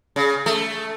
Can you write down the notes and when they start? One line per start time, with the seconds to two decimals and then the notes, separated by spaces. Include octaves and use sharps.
0.16 C#3
0.46 A3